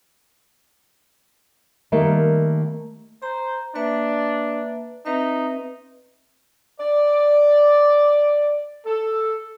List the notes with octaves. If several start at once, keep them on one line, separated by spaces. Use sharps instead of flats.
D#3 G3 A3 A#3
C5 A#5
A#3 D4 B4 E5
C4 D#4 B4 E5
D5
A4